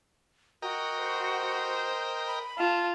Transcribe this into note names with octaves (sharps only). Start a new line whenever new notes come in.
F#4 A#4 D#5 G5
C5
B5
F4 A5